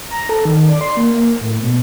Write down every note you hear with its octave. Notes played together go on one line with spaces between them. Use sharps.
A#5
A4
D#3
D5
C6
A#3
A#3
A2
B2